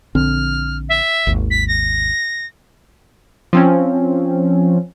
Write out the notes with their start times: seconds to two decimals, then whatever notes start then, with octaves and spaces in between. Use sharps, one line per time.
0.15 A#1 D3 C4 F6
0.89 E5
1.27 G#1 D#2
1.50 B6
1.68 A#6
3.53 F3 C4 C#4